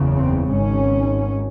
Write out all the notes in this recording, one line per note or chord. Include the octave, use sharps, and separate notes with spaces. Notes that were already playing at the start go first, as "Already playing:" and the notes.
Already playing: F#1 E2 C#3
C4
G#1 G#2 C#4